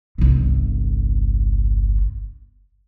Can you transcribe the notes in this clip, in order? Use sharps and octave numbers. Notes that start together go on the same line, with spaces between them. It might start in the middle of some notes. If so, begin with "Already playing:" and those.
G1 C2